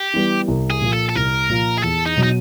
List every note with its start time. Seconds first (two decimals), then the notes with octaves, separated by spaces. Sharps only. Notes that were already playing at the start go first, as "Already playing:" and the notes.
Already playing: G4
0.14 E3 G3 B3
0.48 C2
0.70 G#4
0.81 A#2 F3
0.93 A4
1.09 A4
1.15 C2 A#4
1.49 A#2 F3
1.78 G#4
1.83 E2 A4
2.06 D#4
2.17 B2 F#3
2.23 D#4